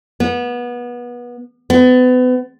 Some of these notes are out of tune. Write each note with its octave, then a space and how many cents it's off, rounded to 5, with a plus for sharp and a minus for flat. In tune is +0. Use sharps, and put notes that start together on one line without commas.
B3 -25
B3 +35